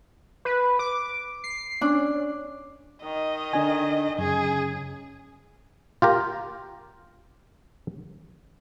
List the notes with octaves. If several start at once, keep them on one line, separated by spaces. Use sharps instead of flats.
B4
D6
C7
C#4 D4
D#3 D#5
D3 D4 G#5
F#2 C#3 G#4
F4 G4 A#4